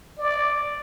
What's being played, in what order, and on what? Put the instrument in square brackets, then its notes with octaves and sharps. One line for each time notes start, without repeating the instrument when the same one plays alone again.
[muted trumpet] D5